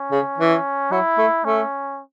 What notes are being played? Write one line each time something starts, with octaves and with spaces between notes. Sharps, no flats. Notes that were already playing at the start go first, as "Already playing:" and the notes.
Already playing: C#4
C#3
E3
F#3 E4
A3
A3 C#4